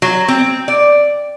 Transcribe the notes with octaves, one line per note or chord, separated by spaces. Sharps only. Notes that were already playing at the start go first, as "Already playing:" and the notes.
F#3
C4
D5